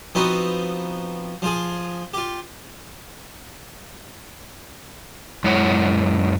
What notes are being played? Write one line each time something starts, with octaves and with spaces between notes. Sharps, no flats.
F3 B3 C4 D#4 F#4
F3 F4 G#4
F4 G4
F#2 G#3 E4 C#5 F#5